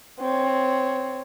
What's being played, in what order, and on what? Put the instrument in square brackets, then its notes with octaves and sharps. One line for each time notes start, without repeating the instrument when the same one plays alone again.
[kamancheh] C4 C#5